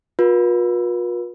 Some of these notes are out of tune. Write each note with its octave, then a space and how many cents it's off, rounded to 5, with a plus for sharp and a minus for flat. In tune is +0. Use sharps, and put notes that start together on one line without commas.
F4 +45 B4 -45